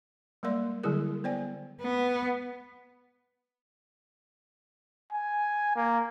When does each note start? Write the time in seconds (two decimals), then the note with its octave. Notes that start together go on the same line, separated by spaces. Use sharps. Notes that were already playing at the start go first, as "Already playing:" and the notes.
0.43 G3 G#3 A#3 A#4 D5 C6
0.84 D3 F#3 G3 E4 G#4 A#4
1.24 B3 C5 D5 G5 G#5
1.82 B3
5.11 G#5
5.76 A#3